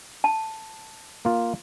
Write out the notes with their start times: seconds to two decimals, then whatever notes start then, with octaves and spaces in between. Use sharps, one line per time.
0.24 A5
1.25 A#3 F4